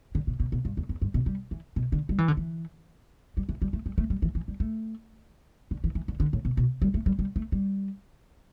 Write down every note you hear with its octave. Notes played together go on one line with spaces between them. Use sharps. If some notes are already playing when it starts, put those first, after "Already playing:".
D3
B2
B2
B2
G2
E2
E2
G2
B2
G3
E3
B2
D3
G3
E3
D3
E3
G3
E3
G3
A3
G3
A3
G3
E3
E3
G3
A3
D3
E3
E3
D3
D3
A2
B2
B2
G3
A3
G3
G3
A3
G3